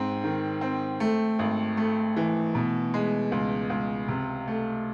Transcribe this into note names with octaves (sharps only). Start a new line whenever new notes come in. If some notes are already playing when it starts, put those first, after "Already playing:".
Already playing: G#2 C4
D#3
C4
A3
G#1
A3
E3
B2
G#3
C#2
C#2
C3
A3